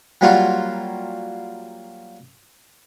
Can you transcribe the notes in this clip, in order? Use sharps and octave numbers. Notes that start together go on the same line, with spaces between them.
F#3 G3 A#3 F4 F#4